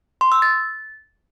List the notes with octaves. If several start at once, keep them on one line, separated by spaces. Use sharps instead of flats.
C6
E6
A6